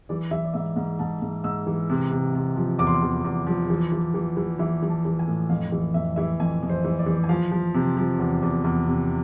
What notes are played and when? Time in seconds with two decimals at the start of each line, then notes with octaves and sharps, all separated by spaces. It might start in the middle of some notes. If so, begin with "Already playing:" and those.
0.09 E3 D5
0.31 E3 E5
0.45 D5
0.54 G#2 E5
0.76 G#2
0.99 G#2 A5
1.22 G#2
1.44 G#2 E6
1.67 E3
1.90 C3
2.12 C3
2.35 C3
2.56 F3
2.79 E2 D6
2.87 C6
2.94 D6
3.02 E2
3.25 E2
3.47 F3
3.70 E3
3.92 E3
4.14 E3
4.37 E3
4.59 E3 E5
4.82 E3
4.90 A5
5.05 E3
5.19 G#5
5.27 A2
5.50 F2 F5
5.72 E3
5.94 F2 E5
6.16 E3 E5
6.40 F2 G#5
6.62 F2
6.69 C5
6.84 E3
6.99 D5
7.06 E3
7.24 G#5
7.29 F3 F5
7.51 F3
7.74 C3
7.97 F3
8.19 E2
8.42 E2
8.64 E2
8.87 C3